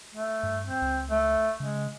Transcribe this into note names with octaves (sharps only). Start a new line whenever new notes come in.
A3
G2
C4
C#2
A3
C#3 G#3